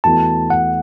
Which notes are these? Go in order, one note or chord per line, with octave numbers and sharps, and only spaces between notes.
E2 E3 A3 F#4 A5
F#5